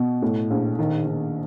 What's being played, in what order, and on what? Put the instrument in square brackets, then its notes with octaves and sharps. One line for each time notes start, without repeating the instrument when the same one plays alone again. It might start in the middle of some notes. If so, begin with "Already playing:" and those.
Already playing: [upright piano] B2
A2
A#1
D#3
D#3